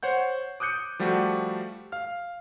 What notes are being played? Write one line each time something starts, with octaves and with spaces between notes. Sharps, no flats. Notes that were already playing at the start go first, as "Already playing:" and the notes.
C5 C#5 F#5 G6
D6 D#6 F#6 G6 C#7
F3 G3 A3 F#4 G4
F5 F6